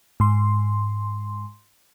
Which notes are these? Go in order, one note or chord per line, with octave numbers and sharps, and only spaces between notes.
G#2 C6